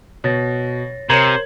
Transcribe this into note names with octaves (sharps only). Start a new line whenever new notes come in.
B2 C#5 A6 A#6
C3 A#4 C5 C#5 A#5 G#6 F#7